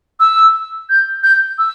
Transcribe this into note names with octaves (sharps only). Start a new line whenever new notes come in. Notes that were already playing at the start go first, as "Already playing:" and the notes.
E6
G6
G6
E6